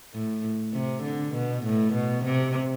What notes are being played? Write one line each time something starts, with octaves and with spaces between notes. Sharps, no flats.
A2
C3
D3
B2
A2
B2
C3